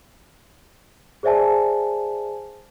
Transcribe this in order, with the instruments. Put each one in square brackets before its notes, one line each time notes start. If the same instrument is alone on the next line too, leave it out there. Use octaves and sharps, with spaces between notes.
[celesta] G#4 C5 D5 E5 G#5 A5